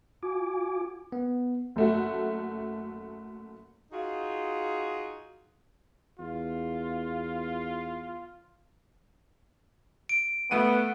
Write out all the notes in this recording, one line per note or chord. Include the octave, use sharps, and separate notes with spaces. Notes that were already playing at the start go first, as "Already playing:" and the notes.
F4 F#4 G#5 D6
B3
F#1 A3 F#4
D#4 F4 F#4 G#4
E2 F4
D7
A3 B3 F#5 D#7